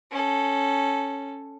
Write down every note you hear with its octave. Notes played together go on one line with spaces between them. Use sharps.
C#4 A4